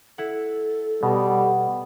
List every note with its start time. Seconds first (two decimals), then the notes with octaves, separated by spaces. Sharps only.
0.18 E4 A4 F#5
1.03 B2 G3 B3